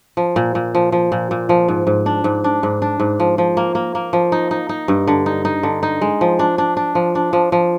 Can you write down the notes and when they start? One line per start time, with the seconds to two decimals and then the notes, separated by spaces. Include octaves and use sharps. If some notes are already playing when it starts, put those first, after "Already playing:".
0.17 F3
0.36 A#2
0.55 A#2
0.75 F3
0.92 F3
1.12 A#2
1.31 A#2
1.49 F3
1.68 G#2
1.87 G#2
2.06 D4
2.24 G#2
2.44 D4
2.63 G#2
2.82 D4
3.00 G#2
3.20 F3
3.38 F3
3.57 A#3
3.75 A#3
3.95 A#3
4.13 F3
4.32 D#4
4.51 D#4
4.69 D#4
4.88 G2
5.07 D3
5.26 D#4
5.45 D#4
5.63 D3
5.83 D#4
6.01 G#3
6.21 F3
6.39 D4
6.58 D4
6.77 D4
6.95 F3
7.15 D4
7.33 F3
7.52 F3